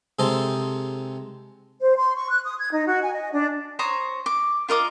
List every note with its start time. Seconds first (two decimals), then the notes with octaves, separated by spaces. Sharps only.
0.19 C3 G#3 D#4 A4 C5
1.80 C5
1.95 C6
2.15 C#6
2.29 F#6
2.43 D#6
2.59 G#6
2.72 D#4
2.86 F#4
3.01 G#5
3.13 D#5
3.32 D4
3.79 C5 C#5 A#5 D#6
4.26 D6
4.69 F4 A#4 D#5 D6